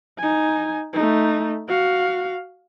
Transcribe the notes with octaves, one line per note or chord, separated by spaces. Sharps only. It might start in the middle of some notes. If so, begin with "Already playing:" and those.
D#4 G#5
A3 D#4
F#4 F5